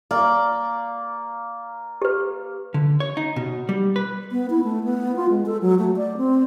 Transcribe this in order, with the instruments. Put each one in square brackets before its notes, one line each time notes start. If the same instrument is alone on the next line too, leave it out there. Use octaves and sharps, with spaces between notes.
[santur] A#3 [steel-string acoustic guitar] D5
[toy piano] G4 B4
[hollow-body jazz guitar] D3
C#5
D#4
B2
G3
B4
[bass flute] B3
E4
A3
B3
F4
G#3
A4
F#3
A3
D5
C4